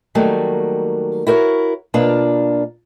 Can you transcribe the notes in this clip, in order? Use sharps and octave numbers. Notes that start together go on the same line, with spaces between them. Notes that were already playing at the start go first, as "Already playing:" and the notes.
D#3 F#3 G3 A3 A#3
E4 F#4 A#4 C5 C#5
B2 A#3 D4 F4